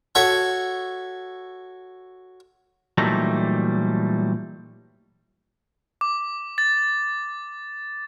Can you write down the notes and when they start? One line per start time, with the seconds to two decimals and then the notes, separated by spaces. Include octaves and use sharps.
0.15 F#4 A4 C#5 E5 A5
2.98 A#2 E3 F#3 G3 A3 D#4
6.01 D6
6.58 A6